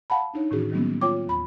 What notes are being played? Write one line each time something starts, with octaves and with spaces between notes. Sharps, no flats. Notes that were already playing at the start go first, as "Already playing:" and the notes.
F5 F#5 A5 B5
D4 D#4 C#5
A2 D#3 E3 C#4 F#4 G#4
D#3 F#3 G3 A#3 B3 C#4
F4 C#5 G5 D6
D#2 B5